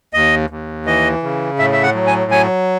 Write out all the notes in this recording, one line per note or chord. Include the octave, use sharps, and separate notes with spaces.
D#2 D#5
D#2
E3 D#5
C#3
A2 E5
E5
F#5
F#3
G#5
F#3 G#5